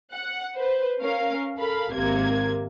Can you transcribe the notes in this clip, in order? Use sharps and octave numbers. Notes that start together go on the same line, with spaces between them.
F#5
B4 C5
C#4 A#4 F5
A4 A#4 F5 B5
G#1 C3 A#3 G#6